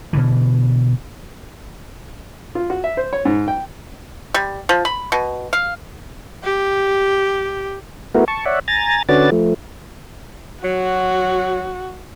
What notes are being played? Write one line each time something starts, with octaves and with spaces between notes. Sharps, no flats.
B2 D3 E3
F4
F#4
E5
C5
C#5
G#2
G5
G3
F3
B5
B2
F5
G4
A3 B3 E4 F#4 A#4
A5 C#6
C#5 D5 E5 F#5
G#5 A#5 A6
D3 C#4 F#4 B4 D5 A6
F3 A3
F#3 F#4